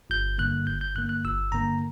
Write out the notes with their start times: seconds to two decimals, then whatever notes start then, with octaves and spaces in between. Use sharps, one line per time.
0.10 G1 G6
0.38 G2 D3 A#3 F#6
0.67 G1 G6
0.81 G6
0.95 G2 D3 A#3 F#6
1.09 F#6
1.24 G1 E6
1.52 G2 D3 A#3 A#5